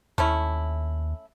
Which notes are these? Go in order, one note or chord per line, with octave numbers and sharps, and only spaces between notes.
D#2 A3 C#4 E4